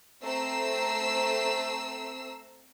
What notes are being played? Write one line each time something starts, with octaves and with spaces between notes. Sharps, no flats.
A3 C4 A#5 E6 C7